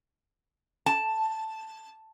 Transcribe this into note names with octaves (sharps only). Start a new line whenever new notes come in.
A5